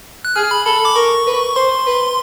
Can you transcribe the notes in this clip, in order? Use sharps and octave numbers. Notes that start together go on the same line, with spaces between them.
F#6
G#4 F6
B5
A4 B5
D6
A#4 C#6
B4
C5 C6
B4